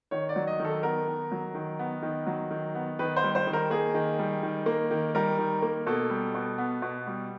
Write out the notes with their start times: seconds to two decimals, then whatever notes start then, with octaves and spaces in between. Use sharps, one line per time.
0.11 D#3 C#5
0.29 D5
0.36 F#3
0.47 D#5
0.59 D#3
0.65 A4
0.83 B3 A#4
1.07 D#3
1.32 F#3
1.55 D#3
1.79 B3
2.02 D#3
2.26 F#3
2.51 D#3
2.75 B3
2.99 D#3 B4
3.16 C5
3.23 G3
3.35 C5
3.47 D#3
3.53 A#4
3.70 A#3 G#4
3.94 D#3
4.19 G3
4.43 D#3
4.66 A#3
4.91 D#3
5.15 G3 A#4
5.39 D#3
5.62 A#3
5.86 B2 A4
6.10 G3
6.34 B2
6.58 B3
6.82 B2
7.07 G3